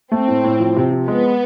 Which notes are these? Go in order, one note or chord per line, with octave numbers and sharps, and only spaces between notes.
A3 C4
A2
A2
F3
C3
F3
G#3 B3